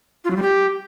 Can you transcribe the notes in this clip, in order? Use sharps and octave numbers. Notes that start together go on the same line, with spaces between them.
F4
F#3
G3
G4